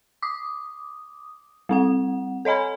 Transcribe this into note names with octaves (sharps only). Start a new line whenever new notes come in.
D6 D#6
G3 C4 F#5
A4 C#5 D#5 G#5 B5